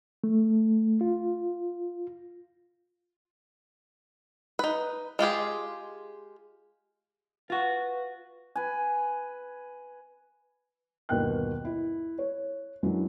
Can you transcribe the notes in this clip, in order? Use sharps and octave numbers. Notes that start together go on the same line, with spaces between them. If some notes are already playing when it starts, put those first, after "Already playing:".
A3
F4
D#4 B4
G#3 F4 G4 G#4
F4 F#4 B4
B4 G#5
G1 D#2 B2 A#4 G5 F#6
E4
C#5
F#2 E3 F#3 G#3 D4